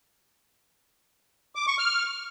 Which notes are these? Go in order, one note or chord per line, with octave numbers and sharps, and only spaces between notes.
D6
C#6
F6